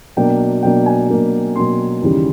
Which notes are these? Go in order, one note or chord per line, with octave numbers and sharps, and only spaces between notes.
B2 F#3 A#3 D4 G5
B2 F#3 A#3 D4 G5
G#5
B2 F#3 A#3 D4
B2 F#3 A#3 D4 C6
D#2 C#3 E3 G3